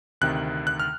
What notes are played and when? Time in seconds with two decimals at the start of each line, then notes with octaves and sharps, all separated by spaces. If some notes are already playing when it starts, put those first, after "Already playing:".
0.21 D2 C3 D#3 F#6
0.67 F#6
0.80 F6